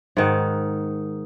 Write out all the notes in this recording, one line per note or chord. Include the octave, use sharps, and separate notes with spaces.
G#2 D#3 F#5